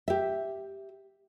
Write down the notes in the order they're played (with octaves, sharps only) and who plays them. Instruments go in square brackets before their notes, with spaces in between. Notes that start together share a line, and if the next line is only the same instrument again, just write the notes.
[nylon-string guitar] G4 E5